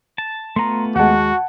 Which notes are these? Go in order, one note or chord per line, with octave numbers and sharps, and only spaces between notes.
A5
A3 B3 F4 A#5 C6
D#2 G#3 F#4 F#5 A5